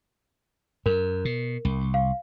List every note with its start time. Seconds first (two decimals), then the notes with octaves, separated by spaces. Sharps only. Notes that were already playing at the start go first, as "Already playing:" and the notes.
0.86 F#2 A#4
1.25 B2
1.65 C2
1.94 F5